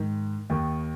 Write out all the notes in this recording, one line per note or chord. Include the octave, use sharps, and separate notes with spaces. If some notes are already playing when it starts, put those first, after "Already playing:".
Already playing: G#2 D#3
D#2 D#3